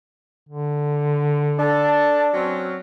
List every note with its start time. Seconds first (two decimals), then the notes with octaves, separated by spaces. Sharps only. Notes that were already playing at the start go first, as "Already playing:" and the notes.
0.49 D3
1.59 D4 A4 A5
2.34 F#3 C4 C#4